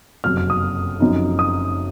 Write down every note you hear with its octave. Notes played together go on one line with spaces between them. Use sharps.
F#1 F2 C3 F#3 F6
F6
D#6
F#1 F#2 F3 C4 D#4
D#6